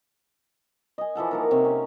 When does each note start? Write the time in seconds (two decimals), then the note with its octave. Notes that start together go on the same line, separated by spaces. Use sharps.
0.98 D#5 G#5
1.15 E3 F3 A4 F#5
1.31 A#3 D#4 A#4
1.51 C3 C#5
1.65 C#4